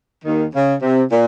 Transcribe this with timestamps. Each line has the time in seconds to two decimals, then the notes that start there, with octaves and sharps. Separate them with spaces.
0.25 D#2 D#3
0.54 C#3
0.82 C3
1.11 A#2